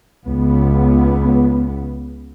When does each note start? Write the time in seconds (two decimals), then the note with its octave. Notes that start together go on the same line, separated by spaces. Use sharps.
0.25 C#2 B3